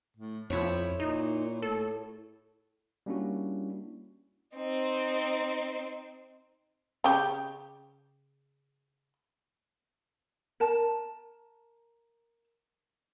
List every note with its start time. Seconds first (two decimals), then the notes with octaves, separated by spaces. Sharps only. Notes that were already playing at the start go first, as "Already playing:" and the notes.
0.17 A2
0.50 F2 F3 E4 C#5
1.00 A#2 D#4
1.62 A2 A4
3.06 G3 A#3 C#4 D4 E4 F#4
4.56 C4 D#4
7.04 C#3 G4
10.60 A#4 A5